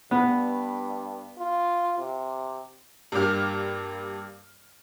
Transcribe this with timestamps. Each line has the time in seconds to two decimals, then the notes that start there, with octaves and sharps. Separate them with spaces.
0.11 G2 B3
1.38 F4
1.98 C3
3.12 G2 A#3 D4 G4 F6